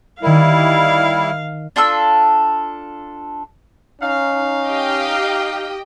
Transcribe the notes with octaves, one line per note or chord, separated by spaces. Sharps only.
D#3 G3 E4 A#4 F5
D4 F4 A4 E6
C#4 D#4 F5
G4 D#5 G5